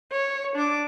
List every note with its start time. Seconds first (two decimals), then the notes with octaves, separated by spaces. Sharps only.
0.12 C#5
0.56 D4 D6